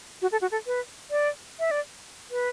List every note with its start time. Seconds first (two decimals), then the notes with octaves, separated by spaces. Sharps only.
0.22 F#4
0.32 A4
0.41 F#4
0.51 A4
0.67 B4
1.11 D5
1.59 E5
1.71 D5
2.31 B4